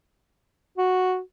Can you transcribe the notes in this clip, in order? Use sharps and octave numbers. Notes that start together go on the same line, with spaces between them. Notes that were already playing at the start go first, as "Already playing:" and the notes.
F#4